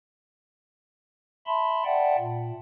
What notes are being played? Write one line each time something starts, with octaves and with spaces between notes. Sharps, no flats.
E5 A5 B5 C6
D5 E5 F#5 G5 A5
A#2